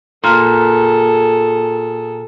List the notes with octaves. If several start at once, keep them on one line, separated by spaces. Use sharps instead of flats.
A#2 G#4 A4